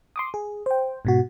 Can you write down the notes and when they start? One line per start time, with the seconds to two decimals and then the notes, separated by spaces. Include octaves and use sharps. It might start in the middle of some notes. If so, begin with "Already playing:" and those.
0.16 C6 D6 D#6
0.34 G#4
0.66 C5 G5
1.05 G#2 B2 F#4